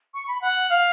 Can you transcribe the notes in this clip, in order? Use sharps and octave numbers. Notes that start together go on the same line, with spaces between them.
C#6
B5
F#5
F5